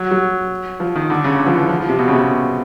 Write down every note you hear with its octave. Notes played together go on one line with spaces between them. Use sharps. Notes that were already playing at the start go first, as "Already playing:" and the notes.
Already playing: F#3
F#3
F3
D#3
D3
C#3
D3
F3
E3
F3
F3
C3
B2
C#3
C3